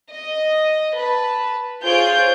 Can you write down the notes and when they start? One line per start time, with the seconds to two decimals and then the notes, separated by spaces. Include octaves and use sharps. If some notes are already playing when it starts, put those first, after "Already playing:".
0.11 D#5
0.95 B4 A5
1.83 F4 G#4 C5 C#5 G6 D7